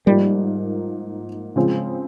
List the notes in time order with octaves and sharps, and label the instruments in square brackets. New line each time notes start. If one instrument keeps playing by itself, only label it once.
[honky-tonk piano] G#2 F3 A#3 [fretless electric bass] G3
[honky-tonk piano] C#3 F3 G#3 C4